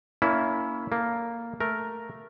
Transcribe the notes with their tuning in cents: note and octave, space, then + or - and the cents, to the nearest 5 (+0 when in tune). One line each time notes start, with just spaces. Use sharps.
A#3 +0 C#4 +30 E4 -5
A#3 +0 A4 +0
A3 +0 A#4 +0